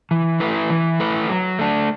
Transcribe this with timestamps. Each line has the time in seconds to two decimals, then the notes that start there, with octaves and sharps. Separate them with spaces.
0.11 E3
0.40 A3 E4 B4
0.70 E3
1.00 A3 E4 B4
1.29 F#3
1.59 A3 D4